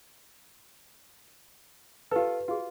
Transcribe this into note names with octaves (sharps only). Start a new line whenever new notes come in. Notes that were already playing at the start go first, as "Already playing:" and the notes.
F4 G4 A4 B4
F4 F#4 G#4